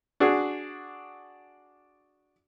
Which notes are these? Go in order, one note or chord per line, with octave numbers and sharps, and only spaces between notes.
D4 F#4 G#4